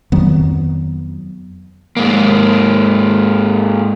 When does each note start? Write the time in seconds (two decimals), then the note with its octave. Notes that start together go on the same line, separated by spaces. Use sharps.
0.12 F2 D#3 F#3 B3
1.97 G#2 A#3